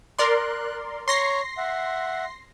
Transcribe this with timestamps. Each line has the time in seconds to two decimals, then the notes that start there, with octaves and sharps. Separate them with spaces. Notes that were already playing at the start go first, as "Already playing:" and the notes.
0.19 A#4 D5 C6 F#6
1.08 C#5 A#5 C6 C#6 A#6 C7
1.57 E5 F#5